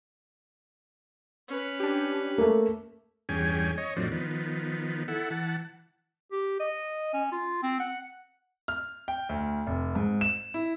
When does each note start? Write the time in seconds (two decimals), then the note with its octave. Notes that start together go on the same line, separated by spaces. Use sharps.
1.48 C#4 B4
1.80 D4 G4
2.38 A3 A#3
3.29 E2 G2 C#4 G#4 G5 G#5
3.78 C#5 D#5
3.96 F2 A2 F3 F#3 C4 D4
4.12 D#3 F3 B3
5.08 E4 A4 F#5
5.30 E3 F#5 A5
6.32 G4
6.60 D#5
7.14 C#4
7.32 F4
7.63 C4
7.80 F#5
8.68 F6
9.08 G5
9.29 D2
9.67 F1
9.95 G#2
10.21 E7
10.54 E4